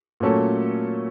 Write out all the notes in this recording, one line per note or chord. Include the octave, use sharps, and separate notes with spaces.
A#2 F#3 A3 C#4 A4